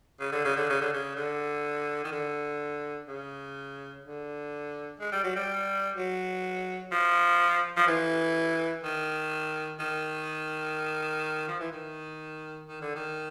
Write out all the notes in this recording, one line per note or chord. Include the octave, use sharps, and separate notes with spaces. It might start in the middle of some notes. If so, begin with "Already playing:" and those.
C#3
D3
C#3
D3
C#3
D3
C#3
D3
D#3
D3
C#3
D3
G#3
G3
F#3
G3
F#3
F3
F3
E3
D#3
D#3
F3
E3
D#3
D#3
D3
D#3